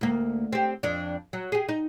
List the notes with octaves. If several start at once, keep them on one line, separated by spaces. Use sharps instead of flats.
D2 A#3
C4 G4
F2 D4
F#3
G4 G#4
D#4